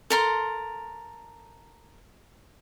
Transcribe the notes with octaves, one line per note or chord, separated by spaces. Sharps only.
A4 A#4 C6